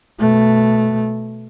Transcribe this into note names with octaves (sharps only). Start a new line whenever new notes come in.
B2 A3